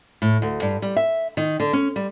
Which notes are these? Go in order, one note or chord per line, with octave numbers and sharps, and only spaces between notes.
A2
D2
G2
G3
E5
D#3
D3
C#4
G3